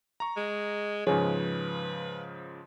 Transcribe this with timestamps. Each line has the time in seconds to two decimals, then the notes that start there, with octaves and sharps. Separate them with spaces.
0.20 A#5 C#6
0.37 G#3
1.07 G#2 C#3 F3 G#4 B4 C#5